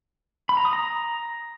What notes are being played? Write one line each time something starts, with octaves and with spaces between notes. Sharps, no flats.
B5
A#5
D#6
A#5